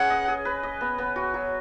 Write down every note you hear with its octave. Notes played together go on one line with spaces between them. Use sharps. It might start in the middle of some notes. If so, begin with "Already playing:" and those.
Already playing: C#4 G#4 B4 F#5
D#5
G#4
B4
D#5
B3
B3
F#4
F#3